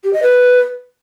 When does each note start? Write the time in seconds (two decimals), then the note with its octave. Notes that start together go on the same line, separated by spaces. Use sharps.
0.04 G4
0.13 D#5
0.23 B4